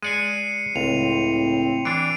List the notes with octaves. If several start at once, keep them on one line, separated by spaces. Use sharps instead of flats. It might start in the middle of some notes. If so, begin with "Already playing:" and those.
G#3 D5 G#5 C7 C#7 D#7
C#2 A2 C4 F7
E3 D4 C7 D7